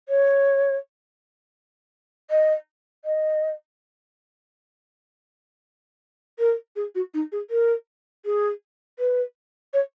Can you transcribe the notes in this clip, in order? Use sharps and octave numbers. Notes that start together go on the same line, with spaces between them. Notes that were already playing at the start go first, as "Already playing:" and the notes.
C#5
D#5
D#5
A#4
G#4
F#4
D#4
G#4
A#4
G#4
B4
C#5